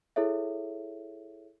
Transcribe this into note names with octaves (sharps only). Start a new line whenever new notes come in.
E4 G#4 A4 C#5 E5